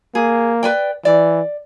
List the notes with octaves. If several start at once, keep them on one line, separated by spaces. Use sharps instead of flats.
A#3 G#4
B4 D5 G5
E3 D5